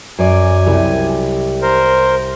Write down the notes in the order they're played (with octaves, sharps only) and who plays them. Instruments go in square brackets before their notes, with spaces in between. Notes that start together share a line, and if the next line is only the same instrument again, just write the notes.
[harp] F#2 D5 [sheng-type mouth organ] G#5
[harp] C2 G4
[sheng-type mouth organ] A#4 C5